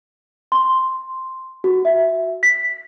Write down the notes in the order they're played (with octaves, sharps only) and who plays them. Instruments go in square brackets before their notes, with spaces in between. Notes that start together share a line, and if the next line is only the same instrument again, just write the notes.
[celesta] C6
F#4
E5
B6